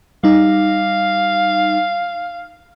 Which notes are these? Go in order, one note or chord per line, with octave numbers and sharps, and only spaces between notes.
G3 D#4 F5